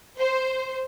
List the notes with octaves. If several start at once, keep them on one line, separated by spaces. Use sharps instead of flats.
C5